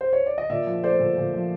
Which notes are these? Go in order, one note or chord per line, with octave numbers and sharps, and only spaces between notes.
C5
C#5
D5
D#5
A#2 D5 E5
F3
A3 C5 D5
A#2
A#2
F3